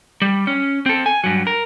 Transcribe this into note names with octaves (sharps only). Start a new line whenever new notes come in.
G3
C#4
C4 A4
G#5
G2 F#3
A#4